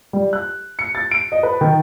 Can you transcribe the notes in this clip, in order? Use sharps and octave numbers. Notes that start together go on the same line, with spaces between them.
G3
F#6
C#7
A6
D7
D#5
B4
D#3